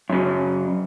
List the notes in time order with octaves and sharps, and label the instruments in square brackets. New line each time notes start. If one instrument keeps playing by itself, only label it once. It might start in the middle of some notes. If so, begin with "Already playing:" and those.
[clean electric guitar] F#2 C#3 F#3